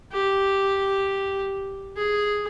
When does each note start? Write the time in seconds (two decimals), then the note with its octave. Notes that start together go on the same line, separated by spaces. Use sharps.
0.12 G4
1.97 G#4